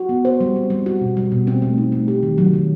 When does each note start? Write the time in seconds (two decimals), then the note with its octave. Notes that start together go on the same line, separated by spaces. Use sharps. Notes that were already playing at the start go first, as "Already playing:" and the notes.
Already playing: F#4
0.09 B3
0.25 C5
0.41 G3
0.56 C4
0.70 G3
0.86 F#4
1.01 B2
1.17 G3
1.32 B2
1.47 C4
1.62 A3
1.78 D#4
1.92 A3
2.08 G4
2.23 D#3
2.38 F#3
2.53 D#3